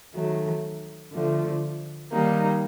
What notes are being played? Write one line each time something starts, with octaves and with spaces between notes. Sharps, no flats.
D#3 F#3 A3
D3 F3 A3
D#3 G3 A#3 D#4